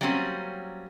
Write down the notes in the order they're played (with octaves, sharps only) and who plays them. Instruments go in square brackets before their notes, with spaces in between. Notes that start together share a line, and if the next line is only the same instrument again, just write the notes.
[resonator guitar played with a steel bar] F#3 G3 A#3 C4 C#4